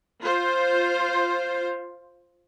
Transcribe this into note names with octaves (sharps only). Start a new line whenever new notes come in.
F4 C5